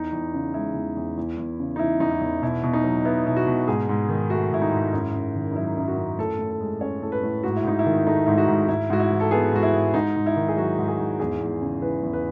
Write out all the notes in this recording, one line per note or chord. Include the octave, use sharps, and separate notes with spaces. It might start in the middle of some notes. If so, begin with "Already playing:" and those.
Already playing: E2 D#4
E2
C#3
G#3 E4
E2
E2
E2
E2
C#3
D#4
E3 E4
E2 D#4
E4
E2
B2 E4
B2
D#4
F#3
B3 E4
B2 E4
F#4
B2
G#2 G#4
G#2
D#3
A3 F#4
G#2 E4
D#4
G#2
F#2 E4
F#2
D#3
D#4
F#3 E4
F#2 E4
F#4
F#2
A2 A4
A2
A4
G#3
C#4 C#5
A2 A4
B4
A2
G#2 F#4
E4
G#2 D#4
E4
D#3
A3 D#4
G#2 E4
F#4
G#2
G#2 E4
G#2 F#4
E4
E3
A4
B3 G#4
G#2 F#4
E4
G#2
G#2 D#4
G#2
E4
D#3
G#4
F#3 F#4
G#2
G#4
G#2
E2 G#4
E2
C#3
E3 B4
E2
B4